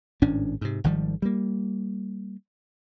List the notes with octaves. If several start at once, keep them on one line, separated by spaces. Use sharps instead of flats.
G#1 A2 C#4 D4
G#2 C3
G#1 D#3 F3 G3
G3 A#3